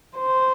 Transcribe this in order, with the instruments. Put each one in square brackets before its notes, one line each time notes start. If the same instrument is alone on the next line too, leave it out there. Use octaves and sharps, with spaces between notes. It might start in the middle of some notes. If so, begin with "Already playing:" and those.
[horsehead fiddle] C5